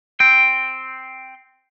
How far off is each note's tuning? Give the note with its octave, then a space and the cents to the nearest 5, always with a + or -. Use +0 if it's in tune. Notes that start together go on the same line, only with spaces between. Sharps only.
C4 +0 G5 +0